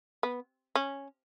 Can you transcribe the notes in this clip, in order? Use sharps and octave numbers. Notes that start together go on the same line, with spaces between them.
B3
C#4